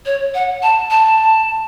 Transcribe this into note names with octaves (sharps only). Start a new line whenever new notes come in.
C#5
F#5
A5
A5